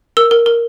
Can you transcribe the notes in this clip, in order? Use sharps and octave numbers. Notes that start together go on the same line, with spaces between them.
A#4 E6
A#4
A#4